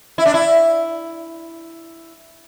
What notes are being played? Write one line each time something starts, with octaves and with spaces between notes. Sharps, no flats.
E4
D4
E4